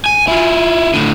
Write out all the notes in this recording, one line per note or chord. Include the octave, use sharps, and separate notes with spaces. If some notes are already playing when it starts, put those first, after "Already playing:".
G#5
E4 F4
A2 D3